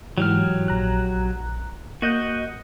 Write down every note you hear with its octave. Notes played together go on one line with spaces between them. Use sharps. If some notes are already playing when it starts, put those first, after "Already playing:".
G#2 E3 F#3 G4 F6
A#1 A#5 F#6
A#3 F#4 D#5 F#6 G6